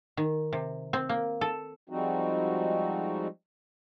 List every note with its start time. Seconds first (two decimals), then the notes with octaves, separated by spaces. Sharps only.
0.17 D#3
0.53 C3
0.93 C4
1.09 A#3
1.41 A4
1.89 F3 G3 G#3 C4 D#4 F#4